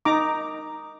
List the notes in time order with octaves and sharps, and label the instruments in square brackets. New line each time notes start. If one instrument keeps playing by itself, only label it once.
[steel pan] D#4 A#5 D6